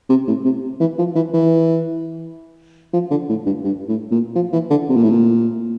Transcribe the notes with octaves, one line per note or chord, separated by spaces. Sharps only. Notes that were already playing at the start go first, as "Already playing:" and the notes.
C3
A2
C3
E3
F3
E3
E3
F3
D3
A2
G2
G2
A2
A#2
F3
E3
D3
C3
A#2
A2
A#2